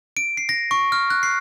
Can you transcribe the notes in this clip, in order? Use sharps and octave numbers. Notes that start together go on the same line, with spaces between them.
D7
C7
A#6
C#6
F6
F#6
C7